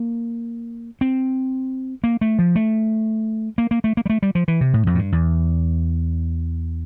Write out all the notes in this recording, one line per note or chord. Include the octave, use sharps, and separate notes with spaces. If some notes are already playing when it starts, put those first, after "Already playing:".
Already playing: A#3
C4
A#3
A3
F3
A3
A#3
A#3
A3
A#3
G3
A3
G3
F3
E3
C3
A2
F2
A2
G2
E2